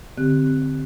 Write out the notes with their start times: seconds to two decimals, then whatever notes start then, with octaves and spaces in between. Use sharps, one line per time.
0.17 D3 C4 G4 F#6